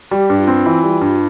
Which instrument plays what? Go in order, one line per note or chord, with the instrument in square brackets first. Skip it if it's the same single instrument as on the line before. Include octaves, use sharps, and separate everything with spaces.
[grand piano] G3 [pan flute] F#4
[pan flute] G4
[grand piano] G2
[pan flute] F4
[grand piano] C4
E3
G3
G2